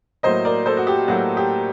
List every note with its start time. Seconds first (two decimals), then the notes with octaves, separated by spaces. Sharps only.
0.23 A2 F#3 A#3 C5 D#5
0.45 A#4 D5
0.66 A4 C5
0.77 F#4
0.87 G4
1.08 A2 F#3 A#3 F#4
1.37 G4